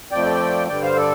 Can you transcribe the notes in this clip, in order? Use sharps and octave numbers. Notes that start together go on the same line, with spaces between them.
F2 F3 A3 D5 G5
G2 D3 G3 D5 G5
C5 F5
A4 D5